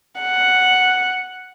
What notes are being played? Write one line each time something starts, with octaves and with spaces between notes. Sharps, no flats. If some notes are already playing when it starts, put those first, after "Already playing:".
F#5